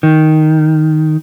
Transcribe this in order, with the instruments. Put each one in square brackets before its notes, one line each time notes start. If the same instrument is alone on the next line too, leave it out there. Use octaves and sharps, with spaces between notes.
[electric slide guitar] D#3